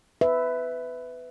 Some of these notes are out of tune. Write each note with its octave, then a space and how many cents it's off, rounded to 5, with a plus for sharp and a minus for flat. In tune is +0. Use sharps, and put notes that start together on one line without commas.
B4 +15 E5 -5